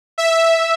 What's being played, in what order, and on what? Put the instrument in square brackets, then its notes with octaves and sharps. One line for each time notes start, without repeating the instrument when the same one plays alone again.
[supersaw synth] E5